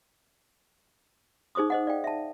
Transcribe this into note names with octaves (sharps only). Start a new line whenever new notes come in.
D#4 G#4 C5 D6 D#6
C5 D#5 F#5
D5 F5 G5
E5 A5